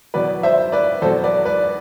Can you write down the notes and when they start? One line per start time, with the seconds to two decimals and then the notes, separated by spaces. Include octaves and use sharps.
0.14 E2 B2 F#3 B4 D5
0.43 C5 E5
0.72 B4 D5
1.02 E2 B2 F#3 A4 C5
1.24 B4 D5
1.45 B4 D5